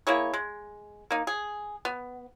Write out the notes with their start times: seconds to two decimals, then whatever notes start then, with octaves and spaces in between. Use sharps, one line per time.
0.07 A#3 E4 G#4 C#5
0.34 G#3
1.11 A#3 D#4
1.27 G#4
1.85 B3